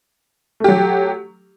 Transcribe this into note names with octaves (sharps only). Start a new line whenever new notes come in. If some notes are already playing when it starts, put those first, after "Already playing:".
F#3 A3 G4